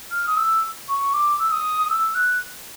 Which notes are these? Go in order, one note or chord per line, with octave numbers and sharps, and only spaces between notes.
F6
D#6
E6
C#6
D6
E6
D#6
E6
F#6